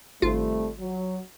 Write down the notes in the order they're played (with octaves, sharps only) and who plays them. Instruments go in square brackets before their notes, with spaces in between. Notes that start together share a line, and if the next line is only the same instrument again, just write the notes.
[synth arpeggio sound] G#1 F4 [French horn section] C3 G3 A3
[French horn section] F#3